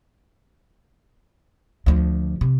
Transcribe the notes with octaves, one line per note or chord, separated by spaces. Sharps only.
D2 F3
C3